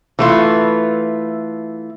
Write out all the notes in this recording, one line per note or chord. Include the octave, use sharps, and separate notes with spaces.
E3 A3 F4